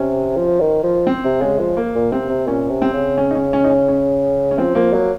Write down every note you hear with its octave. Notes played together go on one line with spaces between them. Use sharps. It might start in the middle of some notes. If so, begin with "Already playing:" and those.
Already playing: C3 C#4
F3
D#3
F3
C4
C3
C#3 G#3
F3
A#3
A#2
C3 C4
C3
A#2 C#4
C3
C4
C#3
C#4
D#4
C#4
C#4
D#4
C#4
C#4
C#4
F3 C4
F3 A#3
F#3 A#3